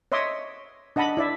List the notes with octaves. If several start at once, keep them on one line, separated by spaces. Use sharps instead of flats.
C#5 D#5 E5 C6 D6 D#6
D4 D#5 F#5 A5 B5
E4 D5 E5